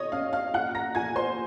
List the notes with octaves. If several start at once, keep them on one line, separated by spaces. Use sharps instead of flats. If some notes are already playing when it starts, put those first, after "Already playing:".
Already playing: C3 C#5 D#5 C#6 D#6
C#4 F5 F6
F5 F6
A#2 F#5 F#6
A#5 A#6
A#2 G#5 G#6
C5 C6